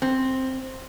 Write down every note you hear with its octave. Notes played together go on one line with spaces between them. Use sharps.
C4